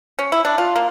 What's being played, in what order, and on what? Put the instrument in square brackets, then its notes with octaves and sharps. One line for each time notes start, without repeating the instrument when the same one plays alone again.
[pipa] C#4
E4
D4
F4
A#3